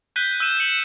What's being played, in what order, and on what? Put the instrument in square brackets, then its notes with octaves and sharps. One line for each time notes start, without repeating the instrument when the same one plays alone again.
[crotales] F#6 G6 B6 D#7 G7
E6 G6 D#7 E7
C#7 F#7